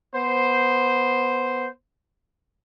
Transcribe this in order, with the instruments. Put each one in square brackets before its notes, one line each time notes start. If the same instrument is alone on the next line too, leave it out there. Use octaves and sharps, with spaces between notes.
[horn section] B3 C5